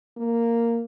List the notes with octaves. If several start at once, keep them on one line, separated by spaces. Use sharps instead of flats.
A#3